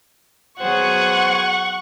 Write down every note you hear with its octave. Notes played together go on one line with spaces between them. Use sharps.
F#3 B3 G#4 C5 F#5 C#6